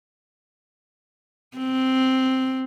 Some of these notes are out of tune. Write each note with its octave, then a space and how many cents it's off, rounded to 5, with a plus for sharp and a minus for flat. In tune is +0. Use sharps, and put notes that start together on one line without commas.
C4 -5